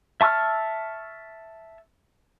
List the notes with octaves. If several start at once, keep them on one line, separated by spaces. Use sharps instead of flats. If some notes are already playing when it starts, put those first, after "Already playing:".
E5 A5 C#6 E6 F6